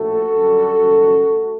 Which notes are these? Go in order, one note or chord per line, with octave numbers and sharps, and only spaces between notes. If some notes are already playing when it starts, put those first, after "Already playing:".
Already playing: A#1 A2 A3 F#4 A4
F#2 D3 G3
F#1 F#2 D#3 G3
A3